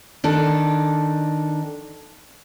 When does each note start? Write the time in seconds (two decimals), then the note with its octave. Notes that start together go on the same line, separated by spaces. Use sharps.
0.24 D#3 D4 A4